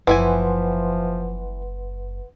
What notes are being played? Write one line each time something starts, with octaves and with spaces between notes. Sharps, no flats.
F#1 E3 F3 E4 B4 F#5 G#5 C6